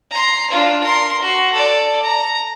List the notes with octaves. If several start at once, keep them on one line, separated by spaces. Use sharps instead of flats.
A#5 C6
D4 F4
A#4 C6
F#4
A4 D5
A#5